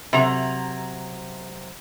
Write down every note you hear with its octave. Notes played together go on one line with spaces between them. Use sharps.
C3 F#3 A#5